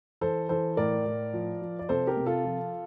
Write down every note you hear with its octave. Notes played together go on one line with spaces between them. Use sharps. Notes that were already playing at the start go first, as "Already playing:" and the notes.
E3 A4 C5
E3 A4 C5
A2 A#4 D5
A2
F3
F3
D5
C3 A4 C5
G4 A#4
C3
F4 A4
F3